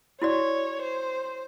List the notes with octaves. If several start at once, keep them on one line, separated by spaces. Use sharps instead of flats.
E4 F#4 C#5 D5
C5